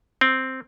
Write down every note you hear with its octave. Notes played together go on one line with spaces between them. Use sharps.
C4